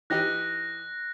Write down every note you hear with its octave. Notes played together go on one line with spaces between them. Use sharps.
E3 D#4 G4 F#6 A#6